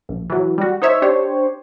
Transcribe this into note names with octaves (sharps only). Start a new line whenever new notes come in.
A#1
E3 F#3
G3 F#4
D#4 C5 C#5 E5
D4 G4 C5 C#5